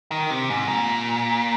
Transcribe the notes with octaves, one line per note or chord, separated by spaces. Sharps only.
D#3
C3
G#2
A#2